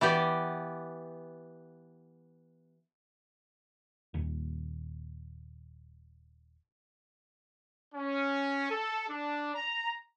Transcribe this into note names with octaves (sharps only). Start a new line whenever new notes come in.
E3 B3 G4 D5
D#1 D#2
C#4
A4
D4
A#5